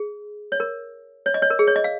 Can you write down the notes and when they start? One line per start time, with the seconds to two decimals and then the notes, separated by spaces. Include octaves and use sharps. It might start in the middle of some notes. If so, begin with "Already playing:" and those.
Already playing: G#4
0.52 C#5
0.60 A#4
1.26 C#5
1.34 D#5
1.42 C#5
1.50 A#4
1.59 G#4
1.67 C#5
1.76 D#5
1.84 F5